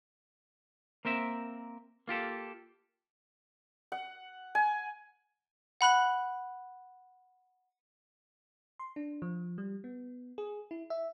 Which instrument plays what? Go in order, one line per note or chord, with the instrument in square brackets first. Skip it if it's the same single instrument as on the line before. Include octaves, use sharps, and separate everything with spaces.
[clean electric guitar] A#3 C4 A#4 E5
A#3 F4 G4 A4
[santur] F#5
G#5
[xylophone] F#5 B5 F#6 F#7
[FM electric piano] C6
D4
F3
G3
B3
G#4
E4
E5